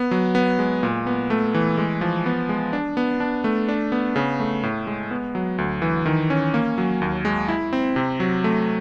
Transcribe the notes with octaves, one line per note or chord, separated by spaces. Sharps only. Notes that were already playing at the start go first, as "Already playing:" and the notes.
Already playing: B3
F#3
B3
G#3
A#2
B3
A3
E3
G#3
F3
B3
G#3
D4
B3
D4
A3
D4
B3
C#3
A3
A2
G#3
B3
F#3
D2
E3
D#3
C#4
A#3
F#3
D#2
G#3
E4
C4
C3
F#3
A3